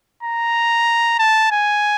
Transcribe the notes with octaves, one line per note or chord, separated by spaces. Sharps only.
A#5
A5
G#5